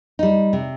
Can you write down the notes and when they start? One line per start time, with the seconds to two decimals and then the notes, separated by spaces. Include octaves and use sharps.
0.19 G3 D#4
0.53 C3